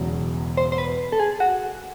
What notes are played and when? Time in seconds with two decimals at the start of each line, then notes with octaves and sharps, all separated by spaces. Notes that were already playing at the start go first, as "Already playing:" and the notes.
Already playing: E1 E2 C#3 F#3
0.57 C5
0.72 C5
0.78 B4
1.12 A4
1.20 G#4
1.40 F#4